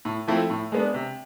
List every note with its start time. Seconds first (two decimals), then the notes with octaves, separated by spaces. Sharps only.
0.05 A2
0.28 F3 A3 C4 E4
0.50 A2
0.72 G#3 B3 D4
0.94 C3